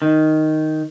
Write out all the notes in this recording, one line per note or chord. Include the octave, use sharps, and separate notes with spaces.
D#3